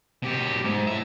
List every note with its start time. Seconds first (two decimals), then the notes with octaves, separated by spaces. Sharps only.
0.22 B2 G4
0.65 G#2
0.87 A2 E5